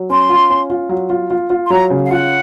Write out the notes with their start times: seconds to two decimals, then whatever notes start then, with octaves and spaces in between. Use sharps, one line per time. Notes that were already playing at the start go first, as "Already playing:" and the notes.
Already playing: F#3
0.09 C#4 C6
0.29 F4
0.50 C#4
0.70 F4
0.89 F#3
1.10 F4
1.30 F4
1.50 F4
1.65 C6
1.70 F#3 A#5
1.90 C#3
2.04 F5
2.10 F4 F#5